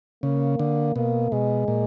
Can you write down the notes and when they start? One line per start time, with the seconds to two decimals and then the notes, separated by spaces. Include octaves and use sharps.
0.23 C#3 A#3
0.59 D3
0.96 B2 A#3
1.32 B2 G#3
1.68 A#2